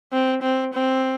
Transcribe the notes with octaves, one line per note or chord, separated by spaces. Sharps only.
C4
C4
C4